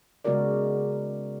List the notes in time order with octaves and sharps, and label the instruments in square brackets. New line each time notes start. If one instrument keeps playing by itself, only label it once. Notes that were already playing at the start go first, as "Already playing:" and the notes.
[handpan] C#3 G#3 B3 F#4 A#4 D5